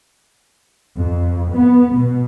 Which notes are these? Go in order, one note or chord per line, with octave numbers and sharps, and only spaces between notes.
F2
B3
B2